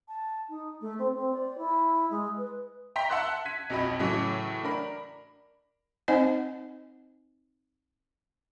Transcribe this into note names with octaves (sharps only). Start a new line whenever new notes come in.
A5
D#4
A3
C4
C4
D5
E4
G#3
B4
G5 A#5 C6 B6
E5 F#5 A5 C6 E6 F#6
G#6 B6 D#7
B1 F2 F#4 D#5 B5
A2 C#3 E3 F#3
D4 A#4 B5
C4 D#4 C5 D#5 F#5 G#5